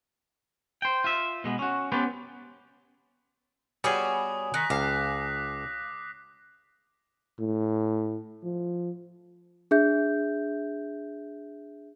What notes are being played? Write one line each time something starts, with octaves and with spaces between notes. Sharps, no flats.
C5 G5
F4 E5
B2 G#3 B3
C#4 F#4
B3 C#4 G4 B4 C5
G3 B3 F#4 G#4 C#5 G#5 D#6
D#3 F#6 A#6 B6
C#2 F5 D6 C7
A2
F3
D4 G#4 E5 G6